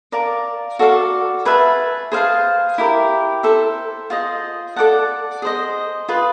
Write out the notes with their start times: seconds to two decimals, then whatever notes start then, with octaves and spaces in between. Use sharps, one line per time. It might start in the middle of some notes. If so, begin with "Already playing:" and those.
0.12 A#4 D5 F5 A5
0.79 F#4 A4 D5 F5
1.45 G#4 B4 E5 A5
2.12 G#4 C5 F5 A5
2.78 E4 G4 A#4
3.43 A4 C5 E5
4.10 F4 G#4 C5 D#5
4.76 A4 D5 F#5 A5
5.42 G#4 C5 D#5
6.09 F4 G#4 B4